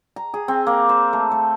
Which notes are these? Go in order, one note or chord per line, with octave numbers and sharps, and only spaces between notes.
A#5
G#4
C4
A#3
C5
A3
A3